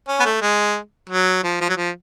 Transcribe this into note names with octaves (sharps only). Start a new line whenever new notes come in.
C#4
B3
A3
G#3
F#3
F3
F3
F#3
F3